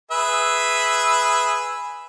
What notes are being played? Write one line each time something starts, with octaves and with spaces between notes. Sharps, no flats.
G#4 B4 E5